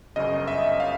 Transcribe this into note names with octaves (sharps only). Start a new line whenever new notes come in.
G1 F#2 C#3 D#5
E5
F5